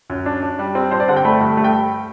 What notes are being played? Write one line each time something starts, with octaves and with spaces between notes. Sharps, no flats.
F#2
D4
D4
G3
C4
G2 C5
D5
D3 F#5
G5
A3 B5
G2
A3
G5